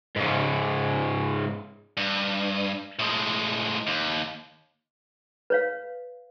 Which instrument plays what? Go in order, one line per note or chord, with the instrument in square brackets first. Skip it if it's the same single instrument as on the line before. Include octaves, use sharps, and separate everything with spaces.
[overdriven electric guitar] G#2 C#3
[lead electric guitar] G2
A2 G#3
D#2
[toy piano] B4 C#5 F5